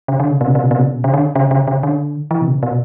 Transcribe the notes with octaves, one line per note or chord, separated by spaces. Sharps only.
C#3
D3
C#3
B2
C#3
B2
C#3
B2
C#3
B2
C#3
D3
C#3
C#3
C#3
D3
E3
B2
C#3
B2